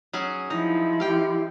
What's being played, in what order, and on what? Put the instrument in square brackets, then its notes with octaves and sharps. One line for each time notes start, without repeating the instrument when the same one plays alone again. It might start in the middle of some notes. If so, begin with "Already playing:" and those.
[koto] F#3 C#4 G#4
[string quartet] F3 [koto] D#4 [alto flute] E4
[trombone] G4 [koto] F5 G5